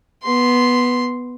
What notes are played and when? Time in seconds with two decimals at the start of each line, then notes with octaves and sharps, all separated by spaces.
0.24 B3 C6